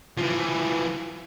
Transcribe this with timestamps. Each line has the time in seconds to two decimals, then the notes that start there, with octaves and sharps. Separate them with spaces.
0.18 E3 F3